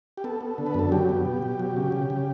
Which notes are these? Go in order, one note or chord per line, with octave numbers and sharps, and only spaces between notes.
G4
B3 A4
B3
D3
B4
F#2 A4
F#3 G4
B3
B2
B2
F#3
C#3
C#3
C#3